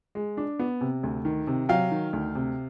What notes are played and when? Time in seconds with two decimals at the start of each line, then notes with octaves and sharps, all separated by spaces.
0.15 G#3
0.37 D4
0.59 B3
0.81 C3
1.03 D2
1.25 D#3
1.47 C3
1.69 F#3 F5 G5
1.91 D#3
2.13 D2
2.35 C3